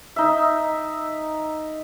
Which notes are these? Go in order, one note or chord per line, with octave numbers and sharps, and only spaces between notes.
D#4 E5